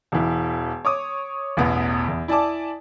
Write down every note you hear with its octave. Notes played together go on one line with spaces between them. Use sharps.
E1 E3
C#5 D6 D#6
A1 E2 B2 B3
E2
E4 D5 G#5 A5 D6